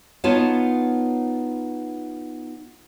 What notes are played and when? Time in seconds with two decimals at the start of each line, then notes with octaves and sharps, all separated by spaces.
0.24 B3 D#4 F4 C#5 F#5 A5